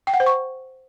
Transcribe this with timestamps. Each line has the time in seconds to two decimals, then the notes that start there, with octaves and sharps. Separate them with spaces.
0.07 G5
0.14 F#5
0.20 C5
0.26 C#6